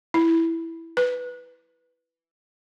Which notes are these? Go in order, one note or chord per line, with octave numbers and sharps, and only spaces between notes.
E4
B4